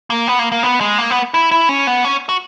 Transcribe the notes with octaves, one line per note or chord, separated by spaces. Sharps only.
A#3
B3
A#3
A#3
B3
G#3
A#3
B3
E4
E4
C#4
B3
C#4
F#4